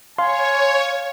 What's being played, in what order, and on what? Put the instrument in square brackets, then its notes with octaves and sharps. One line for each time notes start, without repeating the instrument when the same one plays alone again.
[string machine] C#5 [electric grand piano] F5 [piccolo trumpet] G#5 [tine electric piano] C6